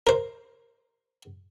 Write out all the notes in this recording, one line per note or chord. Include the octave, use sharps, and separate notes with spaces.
A#4 C5